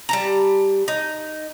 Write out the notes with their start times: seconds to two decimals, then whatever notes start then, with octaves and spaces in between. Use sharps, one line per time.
0.09 G3 A5 A#5
0.88 D#4